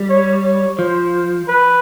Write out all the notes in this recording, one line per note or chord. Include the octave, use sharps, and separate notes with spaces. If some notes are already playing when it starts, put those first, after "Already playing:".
Already playing: G3
C#5
C#5
F3 C5
B4